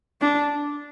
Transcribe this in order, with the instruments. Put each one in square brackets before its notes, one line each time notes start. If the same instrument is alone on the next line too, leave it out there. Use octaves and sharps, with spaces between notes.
[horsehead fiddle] D4